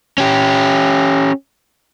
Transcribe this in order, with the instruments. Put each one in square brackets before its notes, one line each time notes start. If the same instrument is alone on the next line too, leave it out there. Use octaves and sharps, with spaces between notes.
[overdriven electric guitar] C#4 G4